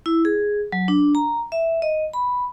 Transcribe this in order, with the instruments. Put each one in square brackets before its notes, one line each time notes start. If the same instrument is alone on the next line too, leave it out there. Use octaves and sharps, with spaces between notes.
[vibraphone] E4
G#4
F#3
D4
A#5
E5
D#5
B5